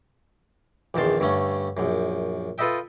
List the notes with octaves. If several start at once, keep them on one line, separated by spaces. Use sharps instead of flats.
A#1 E2 D#3 A5 C6
G2 D3 A3 C#4
A#1 F#2
F4 A4 B4 D#5 E5 G5